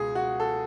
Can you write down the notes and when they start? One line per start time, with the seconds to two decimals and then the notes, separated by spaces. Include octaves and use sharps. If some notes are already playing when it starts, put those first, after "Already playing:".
Already playing: C#2 B2 G#4
0.15 F#4
0.40 A4